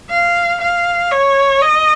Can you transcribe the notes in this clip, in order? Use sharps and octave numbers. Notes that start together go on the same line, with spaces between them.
F5
F5
C#5
D#5